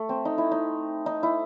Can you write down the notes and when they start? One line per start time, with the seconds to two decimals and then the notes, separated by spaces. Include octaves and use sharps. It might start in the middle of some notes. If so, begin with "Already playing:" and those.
Already playing: A3
0.09 C4
0.25 D#4
0.38 E4
0.52 D#4
1.06 D#4
1.23 E4